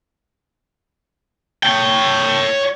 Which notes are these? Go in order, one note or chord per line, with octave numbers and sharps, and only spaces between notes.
C#5 G5